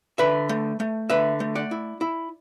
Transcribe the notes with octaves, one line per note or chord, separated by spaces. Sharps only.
D3 B4 E5
A3
A3
D3 B4 E5
A3
D5 F#5
E4
E4